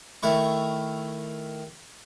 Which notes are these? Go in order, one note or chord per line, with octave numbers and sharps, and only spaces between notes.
D#3 A3 E4 C#6